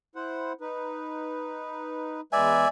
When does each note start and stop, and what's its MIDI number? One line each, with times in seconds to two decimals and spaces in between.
0.16 0.52 64
0.16 0.52 72
0.16 0.52 78
0.61 2.21 63
0.61 2.21 71
2.33 2.65 40
2.33 2.65 56
2.33 2.65 71
2.33 2.68 74
2.33 2.68 76
2.33 2.68 80